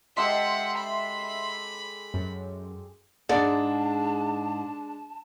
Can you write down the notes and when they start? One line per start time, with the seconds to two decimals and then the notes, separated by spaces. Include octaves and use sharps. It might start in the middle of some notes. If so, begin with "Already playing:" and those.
0.17 G#3 G4 A4 E5 F#5 C6 B6
0.77 B5
2.14 F#2
3.29 G#2 G#3 D4 D5 A5